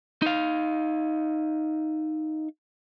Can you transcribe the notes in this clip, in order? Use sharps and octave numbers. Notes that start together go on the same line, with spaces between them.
D#4 F5